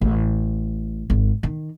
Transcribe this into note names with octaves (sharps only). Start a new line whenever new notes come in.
A1
G#1
D#3